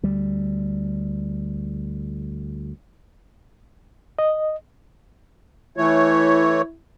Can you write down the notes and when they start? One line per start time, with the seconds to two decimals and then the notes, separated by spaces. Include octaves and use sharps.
0.03 D2 G3
4.19 D#5
5.77 E3 A3 E4 C#5